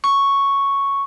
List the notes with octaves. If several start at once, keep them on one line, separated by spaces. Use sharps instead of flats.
C#6